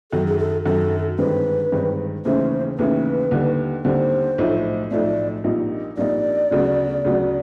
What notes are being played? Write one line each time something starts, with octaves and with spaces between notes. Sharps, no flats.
F#2 D#3 F#3 A4
G#4
A4
F#2 D#3 F#3 A4
G1 G2 D#3 G#3 C4 B4
G1 G2 D#3 G#3 C4
D#2 C#3 E3 A3 C#4 C5
D#2 C#3 E3 A3 C#4 B4
D#2 D3 G3
D#2 D3 G3 C5
B1 A2 F3 A3
B1 A2 F3 A3 D5
A#1 A#2 G3 A#3 D#4
A#1 A#2 G3 A#3 D#4 D5
D2 C#3 F#3 B3
D2 C#3 F#3 B3